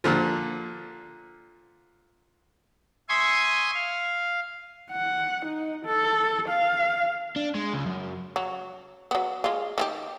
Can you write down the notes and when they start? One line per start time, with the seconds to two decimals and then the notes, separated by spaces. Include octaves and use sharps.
0.04 A#2 D3 F3
3.09 E5 G#5 C6 C#6 D#6
3.75 F5
4.91 F#5
5.46 D#4
5.86 A4
6.49 F5
7.36 D4
7.55 G#3
7.73 C#2
7.86 F#2
8.36 F#3
9.11 F#3 B3
9.44 G#3 F4
9.78 D#3 E4 G4